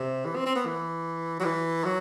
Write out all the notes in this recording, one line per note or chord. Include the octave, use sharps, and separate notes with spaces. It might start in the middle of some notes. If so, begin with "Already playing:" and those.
Already playing: C3
E3
C4
C4
B3
E3
F#3
E3
F#3